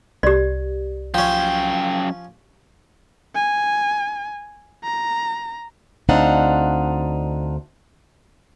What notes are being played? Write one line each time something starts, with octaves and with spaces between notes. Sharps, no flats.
C2 G4 D5
F#2 F3 C#4 G5
G#5
A#5
D2 C4 D4 D#4 F5 F#5